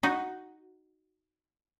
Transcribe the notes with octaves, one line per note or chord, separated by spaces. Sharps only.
D#4 F#4